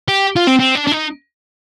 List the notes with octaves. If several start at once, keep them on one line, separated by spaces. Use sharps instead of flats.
G4
F4
C4
C4
D4
D4
D#4